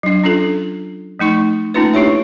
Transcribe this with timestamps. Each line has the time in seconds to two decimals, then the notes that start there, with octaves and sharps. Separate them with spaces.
0.03 F#3 D4
0.24 C#4 D4 F4 A4
0.37 D4
1.19 F3 A3 D#4 C#6
1.74 A3 A#3 C#4 D#4 F4 B4
1.94 D4 E4 G4 C#5 E5